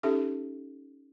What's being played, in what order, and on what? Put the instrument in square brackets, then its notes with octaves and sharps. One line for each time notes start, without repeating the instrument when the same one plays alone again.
[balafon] C#4 D#4 G4 A4 E5